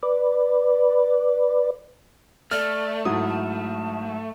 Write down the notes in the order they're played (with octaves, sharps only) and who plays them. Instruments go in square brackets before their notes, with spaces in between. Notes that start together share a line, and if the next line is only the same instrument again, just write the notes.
[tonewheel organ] B4 D5
[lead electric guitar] A3 [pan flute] D5 [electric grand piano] F6
[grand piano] G#2 F#3 E4 [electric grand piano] D#6
[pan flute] A5